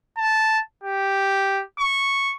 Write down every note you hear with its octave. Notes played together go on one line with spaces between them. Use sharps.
A5
G4
C#6